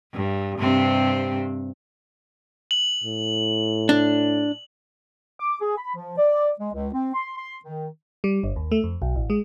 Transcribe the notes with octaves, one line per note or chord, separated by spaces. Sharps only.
G2
G2 C3 C4
F#7
A2
D4
D6
G#4
B5
F3
D5
G#3
C#2
C4
C6
C6
D#3
G3
G1
D#2
A3
F2
B1
A1
G#3